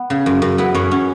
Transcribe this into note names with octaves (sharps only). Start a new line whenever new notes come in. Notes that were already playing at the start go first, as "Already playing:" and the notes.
Already playing: B3
C#3
F#2
F#2
B3 E4
F#2 C#4
C#4